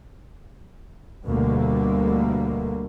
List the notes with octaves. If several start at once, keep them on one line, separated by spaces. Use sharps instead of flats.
D2 B2 D3 G3 A3 A#3